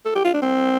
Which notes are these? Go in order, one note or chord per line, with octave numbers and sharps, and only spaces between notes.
A4
G4
F4
D4
C4